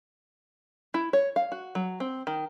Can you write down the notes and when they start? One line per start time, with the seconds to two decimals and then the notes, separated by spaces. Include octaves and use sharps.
0.94 E4
1.13 C#5
1.36 F5
1.52 F#4
1.75 F#3
2.00 C4
2.27 D#3